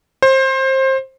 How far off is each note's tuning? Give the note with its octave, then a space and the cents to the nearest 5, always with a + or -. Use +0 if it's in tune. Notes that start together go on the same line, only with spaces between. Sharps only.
C5 +25